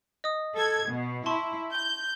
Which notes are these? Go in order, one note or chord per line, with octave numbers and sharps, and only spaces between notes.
D#5 D#6
A4 G#6
B2
E4 A5 C6 C#6
G6